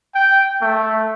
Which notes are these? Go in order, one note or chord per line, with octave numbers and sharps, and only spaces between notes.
G5
A3